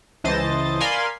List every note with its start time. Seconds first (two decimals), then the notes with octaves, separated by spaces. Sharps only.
0.24 C#2 E3 C5 D#5 A5 A6
0.80 A#4 D5 F5 G#5 B5 C6